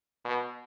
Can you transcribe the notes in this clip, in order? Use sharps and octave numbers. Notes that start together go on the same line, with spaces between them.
B2